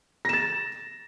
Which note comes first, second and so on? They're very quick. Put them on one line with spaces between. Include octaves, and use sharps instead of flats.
A#6 E7 A6